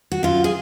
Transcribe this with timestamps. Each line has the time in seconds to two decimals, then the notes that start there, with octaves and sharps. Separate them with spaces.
0.12 F#4
0.23 F#2 F4
0.44 G#4